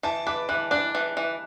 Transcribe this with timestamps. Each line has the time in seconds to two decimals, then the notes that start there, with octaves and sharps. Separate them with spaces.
0.03 E3 A5
0.27 B4 D6
0.49 E3 F#6
0.71 D4 F#6
0.95 E3
1.17 E3